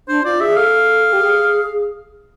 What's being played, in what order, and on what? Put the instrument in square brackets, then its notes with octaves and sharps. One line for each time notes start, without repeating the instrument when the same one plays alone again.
[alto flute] D4 [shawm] C5
[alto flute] F4 [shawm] D5
[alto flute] G#4 [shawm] E5
[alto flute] A4 [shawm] F5
[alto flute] G4
G#4